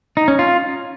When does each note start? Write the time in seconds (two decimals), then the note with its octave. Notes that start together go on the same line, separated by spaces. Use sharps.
0.17 D#4
0.28 C#4
0.39 F4